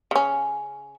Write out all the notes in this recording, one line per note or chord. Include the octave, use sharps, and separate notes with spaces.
C#3 C#4